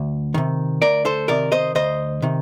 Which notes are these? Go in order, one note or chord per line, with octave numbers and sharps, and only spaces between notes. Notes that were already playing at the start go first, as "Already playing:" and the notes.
Already playing: D2
C3 D#3
D2 A#4 D5
A4 C5
C3 D#3 A#4 D5
C5 D#5
D2 C5 D#5
C3 D#3